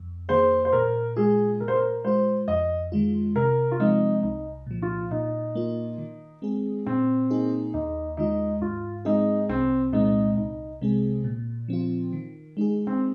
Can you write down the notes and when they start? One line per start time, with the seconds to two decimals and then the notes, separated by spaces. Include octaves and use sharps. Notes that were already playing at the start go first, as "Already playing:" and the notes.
Already playing: F2
0.29 D#3 A#3 G#4 C5
0.65 C5
0.73 A#2 A#4
1.16 G#3 F4 G#4
1.60 A#2 A#4
1.68 C5
1.74 A#4
2.04 G#3 F4 C5
2.48 F2 D#5
2.92 D#3 G#3 F4
3.35 C3 A#4
3.71 F4
3.80 F3 G#3 C4 D#4
4.23 C2 D#4
4.67 A#2 F3
4.82 F4
5.11 A#2 D#4
5.55 A#3 F4
5.98 D#3
6.42 G#3 C4 G#4
6.86 A#2 C4
7.31 A#3 D#4 G#4
7.74 D#2 D#4
8.17 D#3 G#3 D#4 F4
8.61 G#2 F4
9.05 G#3 C4 D#4 G#4
9.49 C2 C4
9.93 A#2 G#3 C4 D#4
10.37 C2 D#4
10.81 C3 G#3 C4 G#4
11.24 A#2
11.68 F3 C4 F4
12.13 D#3
12.57 G#3 D#4 G#4
12.87 C4